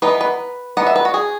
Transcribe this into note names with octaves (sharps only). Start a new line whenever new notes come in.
E3 B3 D#4 B4
B4
E3 B3 D#4 F#5
E5
B4
F#4
G#4